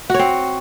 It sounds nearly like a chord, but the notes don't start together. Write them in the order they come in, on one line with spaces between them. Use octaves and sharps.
F#4 C#5 C4